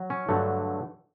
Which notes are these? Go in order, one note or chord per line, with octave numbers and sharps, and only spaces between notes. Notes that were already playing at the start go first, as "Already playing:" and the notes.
Already playing: F#3
C#4
G2 D3 F#3 A3